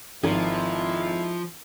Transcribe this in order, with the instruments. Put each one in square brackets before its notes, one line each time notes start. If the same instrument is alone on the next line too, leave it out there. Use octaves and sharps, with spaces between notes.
[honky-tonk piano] G#1 [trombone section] F2 G#3 E4 [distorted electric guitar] F3